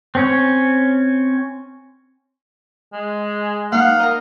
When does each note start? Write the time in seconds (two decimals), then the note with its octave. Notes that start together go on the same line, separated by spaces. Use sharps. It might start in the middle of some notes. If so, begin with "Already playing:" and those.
0.15 C4 C#4 C#5
2.93 G#3
3.72 A#3 D#4 F5 F#5
4.00 A#4 D#5 A#5